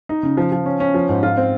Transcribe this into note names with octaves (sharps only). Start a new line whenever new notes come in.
D#4
C#3
F3
F3
C#4
C#4
F3
G#2
F4
C4